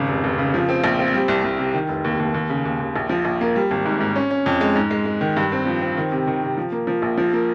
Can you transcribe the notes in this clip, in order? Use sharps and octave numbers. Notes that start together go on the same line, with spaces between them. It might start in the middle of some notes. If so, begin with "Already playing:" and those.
Already playing: G#1 C#3
F1
F1
C#3
F3
C4
A#1
C4
G3
C2
C2
C3
D#3
F1
D#2
D#2
D#2
C#3
D#2
D#2
A#1
F3
A#1
A#3
G3
G#1
G#2
G#2
C#4
C#4
F2
G#3
G#2
G#3
G#3
D#3
G2
C4
F3
C4
D#3
C3
D#3
C3
F3
A#3
F3
A#1
F3
A#3